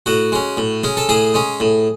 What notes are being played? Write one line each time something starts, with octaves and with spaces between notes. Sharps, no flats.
A2 F#4
G#3 C#4
A2
G#3 C#4
A4
A2 G#4
G#3 C#4
A2